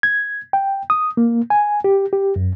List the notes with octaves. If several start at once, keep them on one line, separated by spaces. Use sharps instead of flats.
G#6
G5
D#6
A#3
G#5
G4
G4
F#2